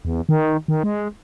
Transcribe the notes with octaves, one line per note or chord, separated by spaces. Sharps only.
E2
D#3
D#3
G#3